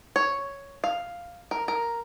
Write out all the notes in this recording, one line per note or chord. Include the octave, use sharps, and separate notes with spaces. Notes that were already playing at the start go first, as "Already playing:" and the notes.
C#5
F5
A#4
A#4